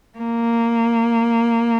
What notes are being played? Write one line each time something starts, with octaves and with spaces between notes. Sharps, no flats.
A#3